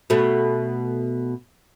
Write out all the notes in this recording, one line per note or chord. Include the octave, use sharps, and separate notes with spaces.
B2 A3